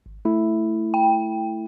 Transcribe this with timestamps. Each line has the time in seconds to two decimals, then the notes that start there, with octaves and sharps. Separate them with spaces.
0.06 G#1
0.25 A3 E4
0.94 G5